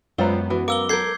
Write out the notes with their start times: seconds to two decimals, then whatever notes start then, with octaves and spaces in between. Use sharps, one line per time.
0.18 F#2 G3 G#3 B3 F4 C5 C#5 A#5
0.50 E3 F#4
0.68 A#4 F5 D6 E6 G7
0.89 A4 A#4 G6 G#6 C7